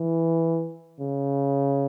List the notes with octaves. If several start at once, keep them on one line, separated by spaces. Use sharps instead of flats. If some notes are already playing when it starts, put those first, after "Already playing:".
Already playing: E3
C#3